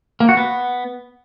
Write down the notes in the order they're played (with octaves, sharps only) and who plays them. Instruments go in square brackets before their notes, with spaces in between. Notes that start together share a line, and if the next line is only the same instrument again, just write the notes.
[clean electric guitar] A#3
F#4
B3